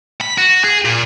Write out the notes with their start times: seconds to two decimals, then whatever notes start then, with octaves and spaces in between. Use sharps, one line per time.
0.21 B5
0.38 F#4
0.64 G#4
0.85 A#2